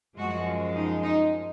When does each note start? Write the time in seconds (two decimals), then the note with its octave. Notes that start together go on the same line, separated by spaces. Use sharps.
0.17 F#2 F3 G#3 F#4
0.76 D#4
1.04 D#4